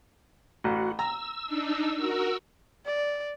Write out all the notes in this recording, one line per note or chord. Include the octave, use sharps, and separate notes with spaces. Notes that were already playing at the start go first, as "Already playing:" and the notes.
A1 F#4
A#5 E6
D4 D#4
F#4 A#4
D5